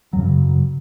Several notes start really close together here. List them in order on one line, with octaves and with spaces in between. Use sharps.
F#3 F#2 C#3